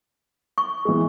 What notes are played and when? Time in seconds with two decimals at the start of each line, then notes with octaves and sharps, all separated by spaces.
0.58 C#6
0.85 E3 G#3